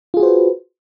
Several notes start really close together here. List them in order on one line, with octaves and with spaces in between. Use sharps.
F4 G#4 F#4 C5 B4